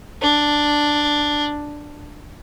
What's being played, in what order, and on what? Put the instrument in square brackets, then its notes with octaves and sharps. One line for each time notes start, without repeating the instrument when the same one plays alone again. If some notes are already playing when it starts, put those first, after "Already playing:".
[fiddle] D4